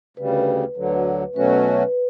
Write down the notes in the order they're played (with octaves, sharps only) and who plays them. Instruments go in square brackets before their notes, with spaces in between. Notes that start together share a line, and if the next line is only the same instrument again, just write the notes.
[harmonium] D2 C#3 G3 [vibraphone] B4
[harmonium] D2 D3 F#3
[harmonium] B2 F#3 A3 C#4 F#4 [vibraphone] B4